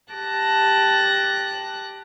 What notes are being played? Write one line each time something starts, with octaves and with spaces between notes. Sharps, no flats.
G4 A5 F#6 A#6